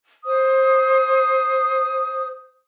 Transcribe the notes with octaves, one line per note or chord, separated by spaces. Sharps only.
C5 D#6